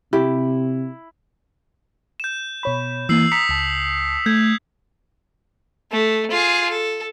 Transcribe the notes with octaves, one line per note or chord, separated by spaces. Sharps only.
C3 E4 G4
G6 E7
B2 C#5 B5
E3 A#3 E6 C7 F#7
A#5 D#6 B6 C#7
C#2 A5
A3 G6 G#6
A3
F4 G#4
A4